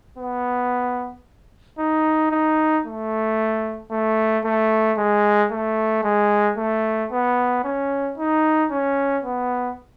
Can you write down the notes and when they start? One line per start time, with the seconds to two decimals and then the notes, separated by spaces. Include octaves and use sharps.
0.18 B3
1.79 D#4
2.31 D#4
2.85 A3
3.91 A3
4.45 A3
4.97 G#3
5.51 A3
6.04 G#3
6.57 A3
7.11 B3
7.64 C#4
8.18 D#4
8.71 C#4
9.24 B3